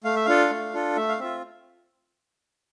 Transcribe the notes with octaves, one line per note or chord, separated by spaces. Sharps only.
A3 F5
E5
D4 F4 A4 F5
A3
D4 F4 A4
A3 E5
F5
C4 F4 E5